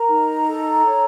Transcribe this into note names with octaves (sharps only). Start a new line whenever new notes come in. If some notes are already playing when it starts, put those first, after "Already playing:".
Already playing: A#4 A#5
D#4
A4
C#5